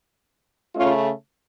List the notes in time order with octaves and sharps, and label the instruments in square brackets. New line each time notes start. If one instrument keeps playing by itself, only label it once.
[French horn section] C#3 A3 C#4 F4